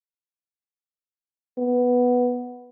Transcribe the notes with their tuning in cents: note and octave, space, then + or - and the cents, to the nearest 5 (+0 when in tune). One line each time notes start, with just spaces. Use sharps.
B3 +0